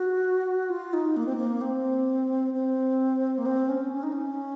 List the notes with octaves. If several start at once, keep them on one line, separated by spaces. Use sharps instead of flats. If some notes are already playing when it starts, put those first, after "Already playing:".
Already playing: F#4
F4
D#4
A#3
C4
A#3
C4
C4
A#3
C4
C#4
C#4
D#4
C#4